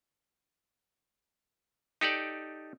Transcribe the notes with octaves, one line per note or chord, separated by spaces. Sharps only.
D#4 G4 A4 D5